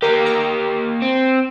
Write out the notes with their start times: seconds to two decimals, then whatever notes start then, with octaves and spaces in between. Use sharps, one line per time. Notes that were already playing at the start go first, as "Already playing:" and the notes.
0.02 A#3 G4 A#4
0.25 A#5
1.02 C4